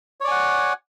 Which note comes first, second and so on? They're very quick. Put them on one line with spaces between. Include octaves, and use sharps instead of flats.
C#5 D5 G#5 F#5